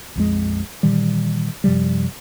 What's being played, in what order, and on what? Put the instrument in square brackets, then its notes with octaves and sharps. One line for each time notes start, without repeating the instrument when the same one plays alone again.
[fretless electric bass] A#1 F2 G#3
A#2 D#3 E3 G3
F#2 C3 F3 G3